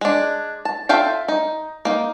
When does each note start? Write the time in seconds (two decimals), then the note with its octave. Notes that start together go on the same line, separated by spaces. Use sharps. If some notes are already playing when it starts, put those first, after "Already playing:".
0.01 G#3 D4
0.65 A5
0.89 F4 A4 E5 F5 G5
1.28 D#4
1.85 A#3 D#4